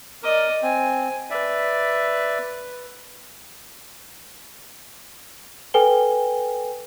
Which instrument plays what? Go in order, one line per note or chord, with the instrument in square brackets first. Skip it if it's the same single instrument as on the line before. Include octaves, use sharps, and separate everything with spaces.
[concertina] A#4 [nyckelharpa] D5 D#5
[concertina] C4 [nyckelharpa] G#5
[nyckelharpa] B4 [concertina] D5 E5
[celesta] A4 B4 G5 G#5 G7